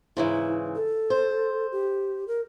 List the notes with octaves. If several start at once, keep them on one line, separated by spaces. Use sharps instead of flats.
G#2 C#3 E3 E4
A4
C5
G4
A#4